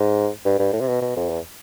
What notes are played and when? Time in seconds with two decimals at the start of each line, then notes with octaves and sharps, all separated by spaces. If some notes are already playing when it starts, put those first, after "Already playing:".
Already playing: G#2
0.46 G2
0.59 G2
0.73 A2
0.81 C3
0.88 B2
1.02 B2
1.16 F2
1.29 E2